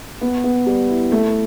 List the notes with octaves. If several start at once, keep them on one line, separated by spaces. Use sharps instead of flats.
B3
B3
G3
E4
A3